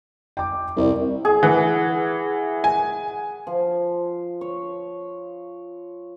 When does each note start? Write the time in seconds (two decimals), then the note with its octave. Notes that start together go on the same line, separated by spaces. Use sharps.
0.37 G5 D6
0.76 C2 A#4 D5
1.25 G#4
1.43 E3 F#5
2.64 G#5
3.47 F3
4.41 C#5